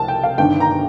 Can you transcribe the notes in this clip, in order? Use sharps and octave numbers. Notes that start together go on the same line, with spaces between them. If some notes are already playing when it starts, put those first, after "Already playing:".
Already playing: C2 C3 F3 A5
G5
F5
G1 G2 D#3 G5
A#5